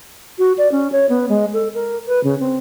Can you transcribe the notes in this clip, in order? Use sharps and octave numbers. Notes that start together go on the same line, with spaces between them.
F#4
D5
C#4
C#5
B3
G#3
A4
A#4
B4
C#3
C4